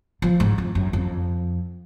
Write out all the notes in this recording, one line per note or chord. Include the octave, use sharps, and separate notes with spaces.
F3
G#2
F2
F#2
F2